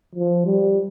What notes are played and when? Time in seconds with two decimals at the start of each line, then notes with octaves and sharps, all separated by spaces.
0.15 F3
0.46 G3